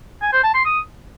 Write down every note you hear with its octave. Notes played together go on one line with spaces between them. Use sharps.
G#5
C5
A5
C6
D#6